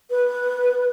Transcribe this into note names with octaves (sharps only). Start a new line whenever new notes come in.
B4